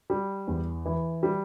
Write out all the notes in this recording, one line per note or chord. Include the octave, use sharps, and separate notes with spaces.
G3
E2
E3
G3